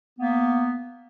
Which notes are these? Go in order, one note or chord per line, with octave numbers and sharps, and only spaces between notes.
A#3 B3